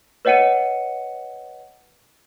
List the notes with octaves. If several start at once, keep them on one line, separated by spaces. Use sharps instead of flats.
B4 C#5 D#5 F#5 C#7 D#7